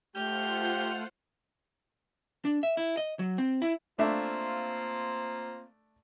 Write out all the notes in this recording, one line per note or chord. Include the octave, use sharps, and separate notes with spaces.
A3 F4 G4 C5 F#5 F6 G6
D4
E5
E4
D#5
F#3
C4
E4
A3 A#3 C4 D4 F4 E5